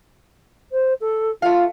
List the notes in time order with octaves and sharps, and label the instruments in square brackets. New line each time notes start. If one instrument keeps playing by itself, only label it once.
[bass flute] C5
A4
[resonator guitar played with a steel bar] A3 F5 [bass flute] F4